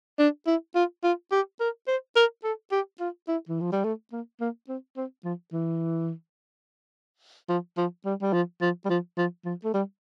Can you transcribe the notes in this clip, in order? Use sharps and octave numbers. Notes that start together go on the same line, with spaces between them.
D4
E4
F4
F4
G4
A#4
C5
A#4
A4
G4
F4
E4
E3
F3
G3
A3
A#3
A#3
C4
C4
F3
E3
F3
F3
G3
G3
F3
F3
G3
F3
F3
F3
A3
G3